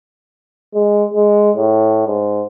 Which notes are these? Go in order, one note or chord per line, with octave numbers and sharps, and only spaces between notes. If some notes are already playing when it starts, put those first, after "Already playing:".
G#3
G#3
A2
G#2